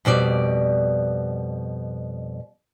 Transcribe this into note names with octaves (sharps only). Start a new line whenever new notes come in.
F2 B2 G3 D5